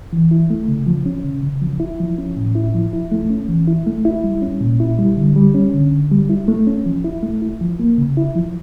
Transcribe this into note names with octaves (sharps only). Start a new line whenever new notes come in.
E3
E4
A3
C#3
F3
C#4
C#3
C#3
F3
E4
F3
C#4
A2
E4
F3
E4
A3
C#4
E3
E4
A3
E4
G3
C#4
A#2
E4
G3
D3
G3
C#4
D3
D3
G3
E4
A3
C#4
F3
E4
A3
E4
F3
A#3
C#3
E4
F3